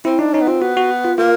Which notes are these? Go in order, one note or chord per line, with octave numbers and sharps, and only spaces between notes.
C4 E4
D4 D#4
C#4 D#4
B3
C4 F4
B3 F#4
F#4
F4
A#3 F4